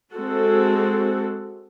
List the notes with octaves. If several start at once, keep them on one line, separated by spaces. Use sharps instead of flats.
G#3 C4 F#4 A4